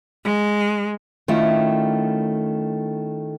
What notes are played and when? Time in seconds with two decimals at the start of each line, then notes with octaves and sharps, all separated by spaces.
0.24 G#3
1.28 D#3 A3 C#4 E4 F4